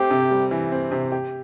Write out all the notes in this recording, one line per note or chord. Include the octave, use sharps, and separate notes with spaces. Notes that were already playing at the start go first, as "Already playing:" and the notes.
Already playing: A3 C4 G4
C3
G3
E3
C4
C3
G4